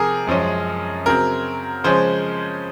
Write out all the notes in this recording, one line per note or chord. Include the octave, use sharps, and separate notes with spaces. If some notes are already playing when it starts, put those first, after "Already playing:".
Already playing: C3 F3 C4 G#4 A#4
F#2 F3 G#3 C#4
C#3 F#3 C4 A#4
C#3 F3 G#3 C#4 C5